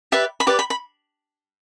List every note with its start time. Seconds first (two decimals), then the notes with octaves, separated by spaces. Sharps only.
0.12 G4 B4 D5 E5
0.40 B5
0.47 G4 B4 D5 D6
0.59 B5
0.70 B5